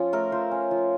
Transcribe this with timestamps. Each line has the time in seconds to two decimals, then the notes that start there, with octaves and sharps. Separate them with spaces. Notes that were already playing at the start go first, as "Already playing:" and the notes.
Already playing: F3 C#4 F4
0.13 A3 A#4
0.32 F3 C5
0.51 C#4
0.71 F3